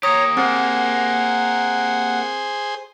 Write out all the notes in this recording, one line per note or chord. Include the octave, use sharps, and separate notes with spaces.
A#3 G4 C#5 A#5 D#6
C4 G#4 C5 F#5